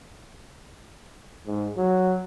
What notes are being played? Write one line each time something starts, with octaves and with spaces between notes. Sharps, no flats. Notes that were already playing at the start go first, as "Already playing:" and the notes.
G#2
F#3